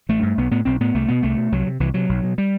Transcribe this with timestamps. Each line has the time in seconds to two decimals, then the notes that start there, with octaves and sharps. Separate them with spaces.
0.09 A1 A3
0.23 G2
0.37 B1 B3
0.51 A2 B3
0.65 B1 C4
0.80 A2 B3
0.94 C2 A3
1.08 B2 B3
1.23 C2 A3
1.37 B2
1.52 C2 F#3
1.67 C3
1.80 C2 E3
1.94 C3 F#3
2.09 B1
2.24 B2
2.38 G3